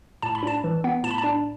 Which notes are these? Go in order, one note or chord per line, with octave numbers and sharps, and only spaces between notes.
A2 A5
B5
D4 A5
E3
B3
A2 A5
B5
A5
D4